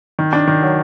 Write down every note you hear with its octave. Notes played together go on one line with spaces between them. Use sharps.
D#3
D4
D#3
F#3